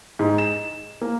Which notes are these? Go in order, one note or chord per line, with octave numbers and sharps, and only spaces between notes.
G#2
E7
A#3